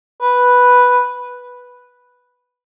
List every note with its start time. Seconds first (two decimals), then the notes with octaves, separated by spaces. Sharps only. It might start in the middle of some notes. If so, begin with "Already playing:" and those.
0.22 B4